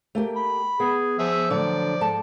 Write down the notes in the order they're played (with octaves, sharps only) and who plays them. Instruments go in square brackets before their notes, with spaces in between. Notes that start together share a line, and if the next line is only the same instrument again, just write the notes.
[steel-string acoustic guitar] A3 A#3 G4
[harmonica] B5
[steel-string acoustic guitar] B3 [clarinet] G#4
[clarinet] F3 [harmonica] G#4 E5
[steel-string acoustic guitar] A2 D3 F#3 [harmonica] D5
[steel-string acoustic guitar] G#2 A4 A5